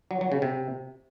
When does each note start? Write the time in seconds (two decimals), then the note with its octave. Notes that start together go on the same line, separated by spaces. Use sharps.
0.11 F#3
0.21 F#3
0.32 C#3
0.42 C3